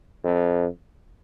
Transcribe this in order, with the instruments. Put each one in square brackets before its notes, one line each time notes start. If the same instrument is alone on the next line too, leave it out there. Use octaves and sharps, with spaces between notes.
[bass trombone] F2